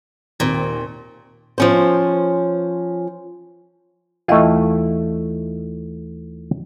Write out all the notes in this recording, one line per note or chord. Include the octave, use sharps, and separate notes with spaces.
D#2 A#2 C4
F3 C#4 C5
D#2 E3 A3 E4 F4 D#5